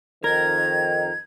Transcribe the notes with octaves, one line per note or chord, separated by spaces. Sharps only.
F2 D#3 A#4 G#6